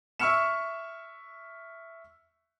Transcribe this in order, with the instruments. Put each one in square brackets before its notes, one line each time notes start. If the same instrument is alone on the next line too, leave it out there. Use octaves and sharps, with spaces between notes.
[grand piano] E5 C#6 E6 F6 C#7 E7